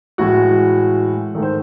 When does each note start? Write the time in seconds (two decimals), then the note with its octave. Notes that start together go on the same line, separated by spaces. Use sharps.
0.18 A2 E3 G#3 F#4
1.35 G#2 D#3 A3
1.42 C5